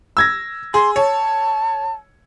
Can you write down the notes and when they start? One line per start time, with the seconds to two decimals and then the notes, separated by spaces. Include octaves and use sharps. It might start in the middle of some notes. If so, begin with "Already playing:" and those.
0.17 E6 G#6 A#6
0.74 G#4 C6
0.96 C#5 A5